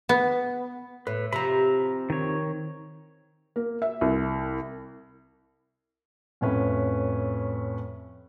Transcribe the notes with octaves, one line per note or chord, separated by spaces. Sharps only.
B3
A2 B4
C3 F3 A#5 B5
D#3 C#5
A#3
E5
C2
F2 A2 C#4 B4